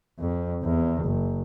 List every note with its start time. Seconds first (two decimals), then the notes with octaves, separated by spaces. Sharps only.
0.20 F2
0.64 E2
1.04 F#1